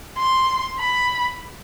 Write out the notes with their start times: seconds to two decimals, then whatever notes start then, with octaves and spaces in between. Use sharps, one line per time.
0.18 C6
0.79 B5